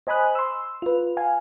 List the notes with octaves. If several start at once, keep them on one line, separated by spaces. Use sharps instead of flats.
C5 D#5 G#5 B5 D#6 F#6
C6 E6
F4 B4
F5 G#5